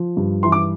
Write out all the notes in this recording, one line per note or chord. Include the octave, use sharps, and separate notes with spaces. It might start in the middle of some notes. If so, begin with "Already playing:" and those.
Already playing: F3
G2
E3 C6
D6